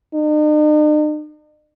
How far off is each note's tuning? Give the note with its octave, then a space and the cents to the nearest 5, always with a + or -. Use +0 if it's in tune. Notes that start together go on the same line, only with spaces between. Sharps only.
D#4 -45